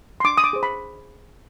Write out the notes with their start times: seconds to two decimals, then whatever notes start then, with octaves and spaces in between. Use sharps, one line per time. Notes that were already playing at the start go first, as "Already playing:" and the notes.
0.20 C6
0.24 D4 D6
0.38 D#6
0.44 D6
0.53 G#4 C5
0.63 B5